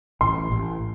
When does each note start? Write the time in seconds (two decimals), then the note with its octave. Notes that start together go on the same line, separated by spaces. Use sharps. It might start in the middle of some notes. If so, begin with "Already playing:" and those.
0.21 A1 C6
0.52 A1